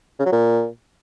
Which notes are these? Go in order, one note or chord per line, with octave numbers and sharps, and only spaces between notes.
C#3
F#3
A#2